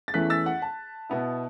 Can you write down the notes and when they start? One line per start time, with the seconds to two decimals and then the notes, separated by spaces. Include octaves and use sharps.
0.08 A6
0.14 E2 E3 A3 C#4 F#6 B6
0.30 E6 A6
0.46 F#5
0.62 A5
1.09 B2 B3 E4